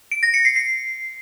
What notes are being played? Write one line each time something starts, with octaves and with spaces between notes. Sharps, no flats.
D7
A#6
C#7
C7
C7